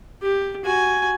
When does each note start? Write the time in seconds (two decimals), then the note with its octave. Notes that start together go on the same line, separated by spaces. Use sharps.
0.22 G4
0.65 F#4 G#5